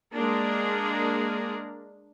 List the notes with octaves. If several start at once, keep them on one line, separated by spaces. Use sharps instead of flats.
G#3 A#3 D4 G#4 A#4